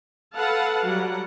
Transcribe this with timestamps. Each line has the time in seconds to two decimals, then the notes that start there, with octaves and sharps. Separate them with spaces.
0.35 A4 B4 F5 F#5 A5
0.84 F#3 G3 F#5